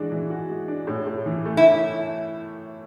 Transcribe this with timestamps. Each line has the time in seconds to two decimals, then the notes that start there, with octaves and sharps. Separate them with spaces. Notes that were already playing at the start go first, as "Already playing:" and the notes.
Already playing: E3 G#3 D4 F#4
0.12 E3
0.30 F#4
0.49 G#3
0.68 D4
0.87 A2
1.07 A2
1.26 E3
1.45 A3
1.57 E4